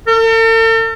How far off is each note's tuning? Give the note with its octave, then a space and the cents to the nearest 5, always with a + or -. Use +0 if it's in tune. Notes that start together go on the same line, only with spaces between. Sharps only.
A4 +45